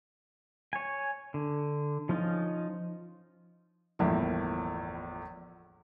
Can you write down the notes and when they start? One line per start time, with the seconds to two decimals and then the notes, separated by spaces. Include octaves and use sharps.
0.73 C#5 G#5
1.34 D3
2.09 F3 C#4 D#4 F4
3.99 G1 E2 A2 F3 A#3 E4